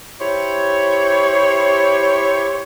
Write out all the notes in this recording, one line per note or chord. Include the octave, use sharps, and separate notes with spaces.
E4 G4 C5 C#5